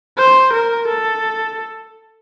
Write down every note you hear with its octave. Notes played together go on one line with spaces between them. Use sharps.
C5
A#4
A4